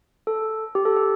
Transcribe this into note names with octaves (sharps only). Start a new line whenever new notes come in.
A4
G4
A4
G4